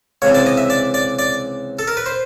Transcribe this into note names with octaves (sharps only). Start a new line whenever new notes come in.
C#2 C3 E3 C#5
D5
D#5
E5
D5
D5
D5
A4
A#4
B4
C5